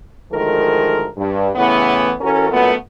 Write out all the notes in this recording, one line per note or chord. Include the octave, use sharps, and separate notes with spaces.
D2 D#3 F3 G#3 A4 A#4
G2
A2 C#3 E3 A3 B3
E3 C#4 F#4 A4 A#4
F#2 A#2 A3 B3